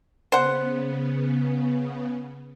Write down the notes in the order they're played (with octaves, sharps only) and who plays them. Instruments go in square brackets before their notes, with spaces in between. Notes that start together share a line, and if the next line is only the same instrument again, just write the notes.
[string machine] C#3 B3 [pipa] C5 F#5